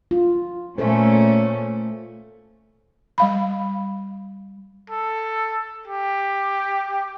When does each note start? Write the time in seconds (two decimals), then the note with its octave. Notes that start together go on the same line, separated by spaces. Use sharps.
0.11 F4
0.78 A#2 A3 C#4 A4 C5
3.18 G3 F5 B5
4.90 A4
5.88 G4